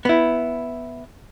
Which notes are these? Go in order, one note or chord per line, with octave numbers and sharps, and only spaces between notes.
B3 E4